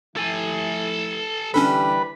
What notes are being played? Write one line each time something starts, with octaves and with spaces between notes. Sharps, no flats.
F3 A3 E4 A4 G#5
D3 E3 G3 C#4 D4 A4 B4